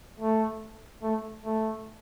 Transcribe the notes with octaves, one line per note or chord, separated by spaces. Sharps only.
A3
A3
A3